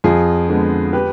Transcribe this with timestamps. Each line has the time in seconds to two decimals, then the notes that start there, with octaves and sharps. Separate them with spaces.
0.04 F2 F4 G#4
0.49 D3 G#3 B3
0.93 G4 B4